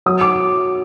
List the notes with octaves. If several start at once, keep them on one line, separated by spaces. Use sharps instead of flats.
F#3 D#6
D6